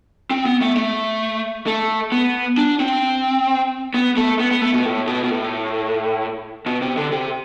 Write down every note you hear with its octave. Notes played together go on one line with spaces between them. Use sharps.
C4
B3
A3
A3
A3
B3
D4
C4
B3
A3
B3
B3
A3
B2
A2
B2
B2
A2
B2
C3
D3
C3